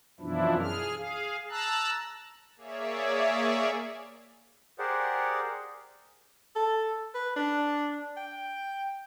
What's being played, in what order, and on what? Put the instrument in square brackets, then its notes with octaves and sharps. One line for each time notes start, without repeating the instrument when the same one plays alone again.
[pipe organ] F#2 B2 E3 F3 D4 E4
G#4 F6
G#4 F5
A5 A#5 E6 F#6
[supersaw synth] A#3 G#4 C#5 D5 E5
[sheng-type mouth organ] G4 G#4 A#4 C5 D5 F#5
[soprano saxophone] A4
B4
D4
G5